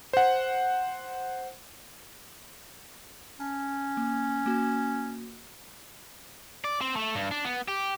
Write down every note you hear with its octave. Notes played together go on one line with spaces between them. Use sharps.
C5 F#5
C#4 A5
A#3
A#3 F#4
D5
C4
A3
G2
D4
B3
G4